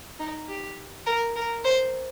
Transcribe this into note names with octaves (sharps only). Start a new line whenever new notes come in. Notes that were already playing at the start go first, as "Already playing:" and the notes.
D#4
G4
A#4
A#4
C5